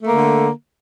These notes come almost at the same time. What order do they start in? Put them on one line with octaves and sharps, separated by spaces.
A3 A#3 D3